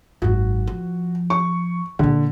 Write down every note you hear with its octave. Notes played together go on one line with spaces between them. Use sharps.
G#1 F#2 F#4
F3
C#6
A#2 D3 E3